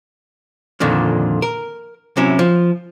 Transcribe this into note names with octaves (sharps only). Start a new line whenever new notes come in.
F2 A#2 D3 D#3 F3
A#4
C3 F#3 C#4 E4
F3